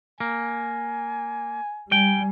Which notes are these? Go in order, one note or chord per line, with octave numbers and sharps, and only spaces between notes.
A#3 G#5
G3 G5 G#5